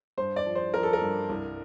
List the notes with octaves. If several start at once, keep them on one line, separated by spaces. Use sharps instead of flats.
G2 C5
D5
F3
C5
F3 A#4
A4
A#4
G2
C2